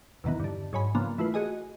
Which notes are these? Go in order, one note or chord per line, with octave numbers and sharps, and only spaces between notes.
E2 B2 D#3 E3 B3
G2 D3
G#2 F#3 C#5 G#5 B5
C#3 F3 A#3 B3 D4
E3 A3 E4 F4 B4
F#4 G#4 D#5 G#5